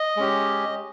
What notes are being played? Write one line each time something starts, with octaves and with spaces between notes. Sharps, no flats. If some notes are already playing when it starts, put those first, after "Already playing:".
Already playing: D#5
G#3 C#4 G4